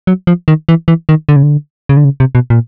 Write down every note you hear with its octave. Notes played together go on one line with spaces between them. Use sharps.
F#3
F3
D#3
E3
E3
D#3
D3
C#3
D3
C#3
D3
C#3
C3
B2
A#2